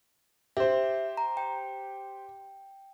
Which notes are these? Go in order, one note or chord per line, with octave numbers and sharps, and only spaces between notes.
G4 C5 E5
A#5
G5